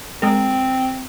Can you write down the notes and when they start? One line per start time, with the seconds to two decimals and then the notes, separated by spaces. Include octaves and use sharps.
0.22 G#3 C4 A#4